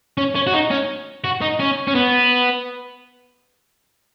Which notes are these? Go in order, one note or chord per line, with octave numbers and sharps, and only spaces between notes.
C#4
C#4
F#4
D#4
C#4
F#4
D#4
C#4
C#4
B3